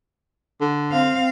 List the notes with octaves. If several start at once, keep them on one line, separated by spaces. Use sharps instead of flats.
D3
C4 F5